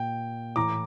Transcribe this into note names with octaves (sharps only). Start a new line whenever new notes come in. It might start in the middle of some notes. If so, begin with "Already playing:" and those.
Already playing: A#2 G5
A2 E3 A#5 D6